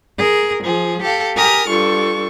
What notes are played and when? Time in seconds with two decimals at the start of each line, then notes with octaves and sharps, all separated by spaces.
0.17 G#4 A#4
0.63 F3 G#4
1.02 G4 A4 F5
1.36 G4 A#4 G#5 D#6 F6
1.67 G2 F4 A4 C#6